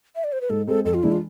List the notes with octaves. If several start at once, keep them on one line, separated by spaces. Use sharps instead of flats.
E5
D5
C5
B4
G#2 A4
G#3 C4 A4
F2 A4
F4
E3 G#3 D4 E4
F4